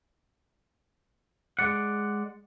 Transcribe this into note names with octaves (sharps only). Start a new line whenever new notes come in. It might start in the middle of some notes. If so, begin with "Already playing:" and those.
G#3 D5 F#5